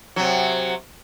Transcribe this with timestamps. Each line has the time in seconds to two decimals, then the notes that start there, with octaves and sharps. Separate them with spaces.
0.16 C3 F#3